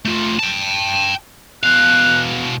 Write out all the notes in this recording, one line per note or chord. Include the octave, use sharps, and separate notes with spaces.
A3 F4
G5 A5
B2 F5 F#6